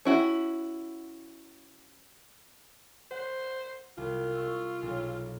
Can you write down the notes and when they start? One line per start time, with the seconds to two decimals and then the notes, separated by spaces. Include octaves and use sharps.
0.05 C#4 E4 F#4
3.11 C5 F#5
3.97 C2 F4
4.34 C#6 E6
4.83 B1